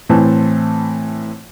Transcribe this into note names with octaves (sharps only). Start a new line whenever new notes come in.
A2 E3 C4 A5